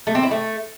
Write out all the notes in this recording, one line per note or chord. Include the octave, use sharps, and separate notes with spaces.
A3
C4
E4
A3